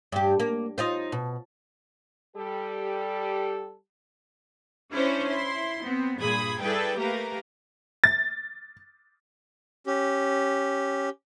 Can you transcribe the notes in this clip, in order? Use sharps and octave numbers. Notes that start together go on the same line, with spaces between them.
G2 G4
A#3
D#4 F4 C5
B2
G3 G4 A4
C#4 D4 E4 C5 C#5
E4 C6
B3 C4
G2 A#2 G#4 B5 D#6 G#6
E4 G#4 A4 B4 D5 G5
A3 A#3 G4 A#4 B4 F5
A6
C#4 G4